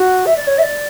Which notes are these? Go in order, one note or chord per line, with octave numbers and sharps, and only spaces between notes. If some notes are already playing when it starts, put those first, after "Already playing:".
Already playing: F#4
E5
D5
C#5
E5
D5